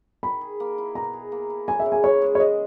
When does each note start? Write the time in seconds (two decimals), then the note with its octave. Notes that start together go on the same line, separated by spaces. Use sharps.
0.23 D#3 B5
0.41 G#4
0.60 A#3
0.78 E4
0.95 B2 A#5
1.13 G#4
1.32 A#3
1.50 E4
1.68 C#3 G#5
1.80 E5
1.86 C#3
1.92 G#5
2.03 E3 C#5
2.22 G#3
2.35 C#5
2.40 E3 D#5